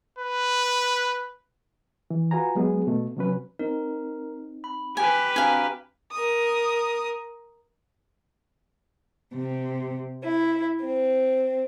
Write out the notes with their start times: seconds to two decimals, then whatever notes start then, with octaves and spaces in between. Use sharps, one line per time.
0.19 B4
2.10 E3
2.31 F4 F#4 B4 G#5 A#5
2.55 F#3 G#3 B3 G#4
2.87 B2 A3
3.17 C3 F#3 C#4 B4
3.59 C4 D#4 A#4
4.64 B5
4.97 G4 B4 G#5
5.36 C4 D4 F#4 F5 G#5 A#5
6.12 A#4 D#6
9.35 C3
10.23 E4
10.83 C4